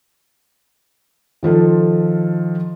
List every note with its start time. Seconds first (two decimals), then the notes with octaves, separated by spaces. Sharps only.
1.43 D#3 F3 F4 A4